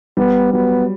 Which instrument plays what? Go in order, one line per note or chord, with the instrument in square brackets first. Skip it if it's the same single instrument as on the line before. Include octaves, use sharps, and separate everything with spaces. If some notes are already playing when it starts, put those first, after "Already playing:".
[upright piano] G3 [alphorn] B3
[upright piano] F#3 [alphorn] B3